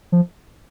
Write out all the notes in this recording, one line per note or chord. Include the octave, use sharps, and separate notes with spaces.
F3